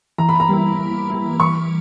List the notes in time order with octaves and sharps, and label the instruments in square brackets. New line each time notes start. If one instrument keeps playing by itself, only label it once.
[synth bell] E3 [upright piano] A#5
[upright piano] B5
A#5
[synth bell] G3 A#3 E4
E3
G3 A#3 E4
[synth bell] E3 [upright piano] C#6